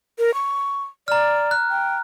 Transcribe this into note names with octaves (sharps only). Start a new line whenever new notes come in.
A#4
C#6
D5 A#5 F6
F#6
G5